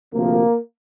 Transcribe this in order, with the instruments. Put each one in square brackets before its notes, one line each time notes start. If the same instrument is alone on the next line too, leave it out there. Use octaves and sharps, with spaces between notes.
[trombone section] D2 C3 F3 A#3